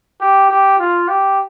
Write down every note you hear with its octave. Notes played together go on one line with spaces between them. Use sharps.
G4
G4
F4
G4